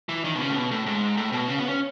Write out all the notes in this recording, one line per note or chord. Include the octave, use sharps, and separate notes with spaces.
E3
D#3
B2
C#3
A2
B2
A2
G#2
A2
B2
C#3
B3
C#4